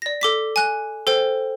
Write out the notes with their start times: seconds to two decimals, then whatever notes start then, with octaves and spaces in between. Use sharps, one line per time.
0.02 D5 A#6
0.21 A4 D6 B6
0.56 G#5 F#6
1.07 A4 C5 G5